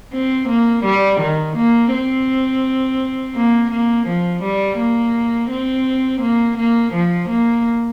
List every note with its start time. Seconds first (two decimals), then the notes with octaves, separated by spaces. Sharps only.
0.13 C4
0.49 A#3
0.84 G3
1.20 D#3
1.57 A#3
1.92 C4
3.35 A#3
3.71 A#3
4.07 F3
4.43 G3
4.78 A#3
5.50 C4
6.21 A#3
6.57 A#3
6.93 F3
7.29 A#3